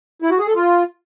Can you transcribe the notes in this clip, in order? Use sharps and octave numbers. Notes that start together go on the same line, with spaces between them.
E4
F#4
G#4
A4
F4